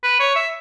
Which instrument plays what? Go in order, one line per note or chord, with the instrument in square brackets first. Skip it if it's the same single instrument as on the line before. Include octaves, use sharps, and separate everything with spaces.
[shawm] B4
C#5
E5